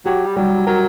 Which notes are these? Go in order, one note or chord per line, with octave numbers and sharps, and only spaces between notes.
F#3 G4
G3
F#3 G3
F#3 A#4